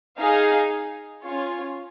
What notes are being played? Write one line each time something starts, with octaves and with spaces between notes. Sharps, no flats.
D#4 G#4 F5
C#4 F4 C#5